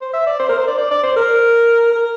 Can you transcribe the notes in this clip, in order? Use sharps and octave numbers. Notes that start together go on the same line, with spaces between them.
C5
E5
D5
C5
A#4
C5
D5
D5
D5
C5
A#4
A#4